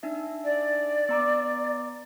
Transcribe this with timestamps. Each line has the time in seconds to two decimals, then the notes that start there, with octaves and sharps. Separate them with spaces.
0.03 D4 D#4 E5
0.44 D5
1.09 B3 A#5 D6